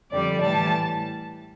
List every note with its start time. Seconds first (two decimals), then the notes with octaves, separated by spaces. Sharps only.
0.11 F2 D3 G3 D5
0.42 A2 E3 G3 A5